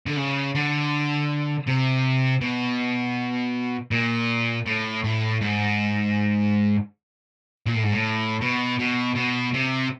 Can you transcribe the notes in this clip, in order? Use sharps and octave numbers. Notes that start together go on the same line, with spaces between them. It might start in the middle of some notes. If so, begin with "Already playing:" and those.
D3
C#3
D3
C3
B2
A#2
A2
A2
G#2
A#2
A2
G#2
A2
B2
B2
B2
C3